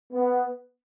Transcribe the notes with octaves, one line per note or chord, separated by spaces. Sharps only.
B3